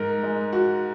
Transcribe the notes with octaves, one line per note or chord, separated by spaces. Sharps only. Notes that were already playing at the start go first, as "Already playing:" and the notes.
Already playing: G#2 A#4
G#3
F#4